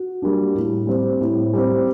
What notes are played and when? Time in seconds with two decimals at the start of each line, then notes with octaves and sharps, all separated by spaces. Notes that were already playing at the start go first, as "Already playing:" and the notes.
Already playing: F#4
0.22 G3 A#3 D4
0.55 A2
0.87 G3 C4
1.21 A2
1.53 G3 C4